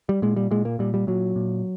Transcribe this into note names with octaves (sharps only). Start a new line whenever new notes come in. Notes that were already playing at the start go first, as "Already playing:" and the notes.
G3
A#2 G#3
G3
A#2 G#3
A#3
A#2 G3
G3
A#2 F#3
A#2